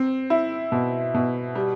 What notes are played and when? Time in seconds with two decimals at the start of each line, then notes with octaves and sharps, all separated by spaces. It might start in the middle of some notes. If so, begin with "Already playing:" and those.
Already playing: C4
0.30 E4
0.72 B2
1.14 B2
1.55 G3